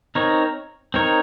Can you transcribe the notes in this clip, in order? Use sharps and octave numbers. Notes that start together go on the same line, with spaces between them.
C4 D#4 A#4 C#5
C4 D#4 A#4 C#5